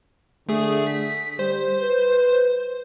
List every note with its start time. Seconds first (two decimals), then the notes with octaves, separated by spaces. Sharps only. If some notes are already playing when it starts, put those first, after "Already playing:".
0.49 D3 A3 G#4
0.87 B6
1.39 G3 C5
1.81 B4